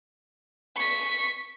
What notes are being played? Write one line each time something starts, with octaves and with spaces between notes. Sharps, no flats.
C#6 B6